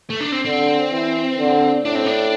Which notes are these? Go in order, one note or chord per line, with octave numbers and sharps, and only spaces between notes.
A3
D4
C4
D3 C4
E3
D3
A2 D4
C4
D4